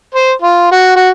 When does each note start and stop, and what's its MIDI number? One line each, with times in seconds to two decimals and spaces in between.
0.15 0.32 72
0.42 0.67 65
0.72 0.94 66
0.96 1.09 66